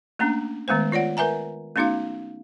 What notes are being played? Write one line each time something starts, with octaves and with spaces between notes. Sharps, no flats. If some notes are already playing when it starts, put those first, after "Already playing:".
A3 A#3 C#4 D4
D#3 G#3 A3 B3 C5
F4 C#5 D5 F#5
A#4 B4 E5 G#5 A#5
A3 B3 C#4 D#4 F#4 F5